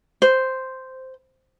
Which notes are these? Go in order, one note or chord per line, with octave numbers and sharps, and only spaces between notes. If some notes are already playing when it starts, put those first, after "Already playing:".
C5